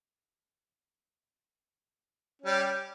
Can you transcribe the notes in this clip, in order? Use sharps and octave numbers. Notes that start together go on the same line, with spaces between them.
G3 C#4 G4